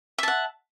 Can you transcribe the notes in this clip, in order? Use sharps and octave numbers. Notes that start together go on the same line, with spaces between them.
E5 F#5 A5